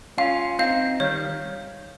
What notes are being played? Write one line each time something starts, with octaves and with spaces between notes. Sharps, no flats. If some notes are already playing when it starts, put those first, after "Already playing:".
C#4 F4 F5
C4 D#4 F5
D#3 G3 C#5